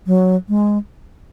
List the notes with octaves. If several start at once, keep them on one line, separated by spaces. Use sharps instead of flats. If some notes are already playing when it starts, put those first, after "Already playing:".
F#3
G#3